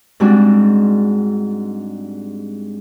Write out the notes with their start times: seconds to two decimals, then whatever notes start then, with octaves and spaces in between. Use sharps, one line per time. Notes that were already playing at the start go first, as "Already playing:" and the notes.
0.20 G#2 G3 G#3 C4 D4 F#4